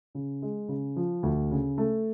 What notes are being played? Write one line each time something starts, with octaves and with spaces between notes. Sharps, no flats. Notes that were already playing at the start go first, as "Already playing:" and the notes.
C#3
G#3
C#3
F3
D2
C#3
A3